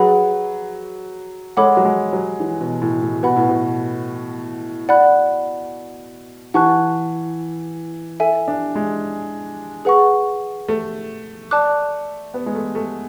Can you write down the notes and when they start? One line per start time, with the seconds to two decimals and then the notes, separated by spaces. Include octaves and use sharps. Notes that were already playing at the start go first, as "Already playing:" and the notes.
Already playing: F#3 G#4 B4 F#5 B5
1.57 G#3 A4 C#5 F#5 B5 D6
1.77 F#3
1.85 G#3
2.13 F#3
2.40 E3
2.61 B2
2.82 A2
3.02 A2
3.23 B2 B4 F#5 B5
3.36 A2
3.49 B2
4.89 D5 F#5 B5 F#6
6.54 E3 F#5 A5 C#6 F#6
8.20 A4 E5 G#5
8.48 D4
8.75 G#3
9.85 G#4 B4 F#5 C#6
10.69 A3
11.51 D5 A5 D6 F#6
12.34 B3
12.46 G#3
12.55 A3
12.75 A3